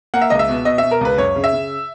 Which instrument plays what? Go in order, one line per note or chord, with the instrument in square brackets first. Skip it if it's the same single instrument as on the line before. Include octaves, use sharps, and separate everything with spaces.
[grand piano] A#3 F#5
E5
C#2 D#5
E5
B2
B2 D#5
B2 E5
A#4
C#2 B4
F#2 C#5
C#3
E5
C#3